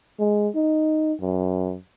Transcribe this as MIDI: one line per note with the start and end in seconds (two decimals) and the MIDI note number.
0.19 0.48 56
0.55 1.13 63
1.21 1.76 42